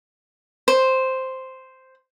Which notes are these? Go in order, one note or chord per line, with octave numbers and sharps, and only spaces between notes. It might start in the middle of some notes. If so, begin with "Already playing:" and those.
C5